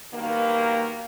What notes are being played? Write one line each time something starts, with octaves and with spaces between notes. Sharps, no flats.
G2 B2 D#3 A#3